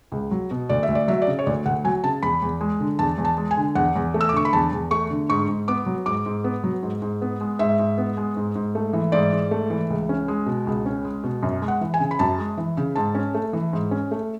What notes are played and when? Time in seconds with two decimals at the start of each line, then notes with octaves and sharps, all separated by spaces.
0.12 C#2
0.31 F#3
0.51 B2
0.69 D2 D5
0.83 E5
0.88 D2
0.95 D5
1.08 F#3 E5
1.22 D5
1.27 C#3
1.39 C#5
1.46 D2 D5
1.66 D2 F#5
1.84 F#3 G#5
2.04 C#3 A5
2.23 E2 B5
2.42 E2
2.61 G#3
2.80 D3
2.99 E2 A5
3.18 E2
3.25 A5
3.37 G#3
3.51 G#5
3.57 D3
3.75 E2 F#5
3.96 E2
4.14 A3
4.21 E6
4.29 D6
4.33 D3 C#6
4.45 B5
4.53 E2 A5
4.72 E2
4.91 A3 C#6
5.10 D3
5.29 G#2 C#6
5.48 G#2
5.68 B3 D6
5.86 F#3
6.06 G#2 D6
6.26 G#2
6.44 B3
6.64 F#3
6.83 G#2
7.02 G#2
7.22 B3
7.41 G#3
7.59 G#2 E5
7.79 G#2
7.98 B3
8.17 G#3
8.37 G#2
8.55 G#2
8.75 A3
8.93 E3
9.12 G#2 D5
9.33 G#2
9.51 A3
9.70 E3
9.90 C#2
10.09 C#4
10.28 G#3
10.46 B2
10.67 C#2
10.86 C#4
11.04 G#3
11.23 B2
11.43 F#2
11.62 G#3
11.68 F#5
11.81 E3
11.94 G#5
12.00 C#3
12.11 B5
12.19 F#2 A5
12.38 G#3
12.58 E3
12.77 C#3
12.96 G#2 A5
13.15 C#4
13.34 A3
13.53 E3
13.73 G#2
13.91 C#4
14.11 A3